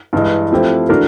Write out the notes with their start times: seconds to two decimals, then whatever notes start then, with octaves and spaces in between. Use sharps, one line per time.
0.13 G2 E3 G#3
0.52 F3 A3 C4 E4 G4
0.89 E3 A3 D4 F#4 A#4